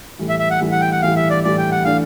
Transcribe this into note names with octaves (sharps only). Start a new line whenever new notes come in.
A2 E3 G3
E5
E5
F#5
A2 E3 G3
F#5
G5
F#5
A2 E3 G3 F5
E5
D5
A2 E3 G3 D5
G5
F#5
E3 A3 D4 F5